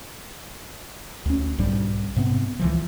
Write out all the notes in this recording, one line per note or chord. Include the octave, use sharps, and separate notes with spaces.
D2 C#4
B1 G#2 G3 D4
G#2 C3 B3 C4
C#2 E3 F3